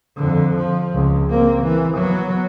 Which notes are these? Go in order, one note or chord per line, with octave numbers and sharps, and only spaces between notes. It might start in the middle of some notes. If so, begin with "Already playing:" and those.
F2 D3
F3
C#2
A#3 C4
E3
F#3 B3